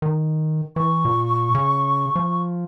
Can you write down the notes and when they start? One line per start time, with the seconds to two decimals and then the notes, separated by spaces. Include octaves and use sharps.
0.02 D#3
0.76 E3 C#6
1.05 A#2
1.55 C#3
2.16 F3